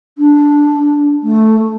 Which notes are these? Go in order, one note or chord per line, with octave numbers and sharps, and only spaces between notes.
D4
A3